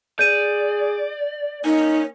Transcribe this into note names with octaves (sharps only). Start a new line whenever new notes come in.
G#4 D5 G6 D#7
A#3 D#4 C#5 G#5